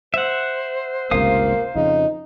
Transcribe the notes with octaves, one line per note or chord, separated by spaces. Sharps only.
C5 E5 F#5
G1 C#2 C3 A#3 F5 D#6
F2 C#3 D#4